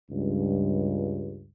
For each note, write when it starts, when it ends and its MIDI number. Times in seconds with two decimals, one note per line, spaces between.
0.10 1.46 37
0.10 1.46 43